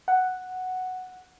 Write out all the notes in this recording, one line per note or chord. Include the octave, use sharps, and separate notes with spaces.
F#5